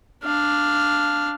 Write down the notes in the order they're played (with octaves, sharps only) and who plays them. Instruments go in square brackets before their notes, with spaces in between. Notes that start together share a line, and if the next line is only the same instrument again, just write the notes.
[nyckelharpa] D4 F5